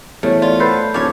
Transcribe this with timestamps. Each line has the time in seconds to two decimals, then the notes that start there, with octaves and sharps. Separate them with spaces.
0.23 E2 C#3 A3 G4 C5 C#5
0.42 F4 D5
0.60 A4 B4 C5 F#5 E6
0.94 D1 F3 C#4 D#4 C#5 F5 D6